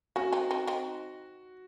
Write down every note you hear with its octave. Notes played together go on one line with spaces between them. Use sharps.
A#3 C#4 F#4
C4 D#4
C4 D#4
C4 D#4